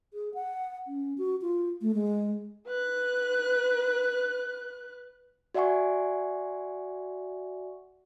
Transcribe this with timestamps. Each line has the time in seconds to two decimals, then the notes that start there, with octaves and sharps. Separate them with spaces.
0.14 G#4
0.34 F#5
0.87 C#4
1.18 F#4
1.42 F4
1.81 A3
1.95 G#3
2.67 B4 F#6
5.54 F#4 D5 E5 F#5 G#5 C#6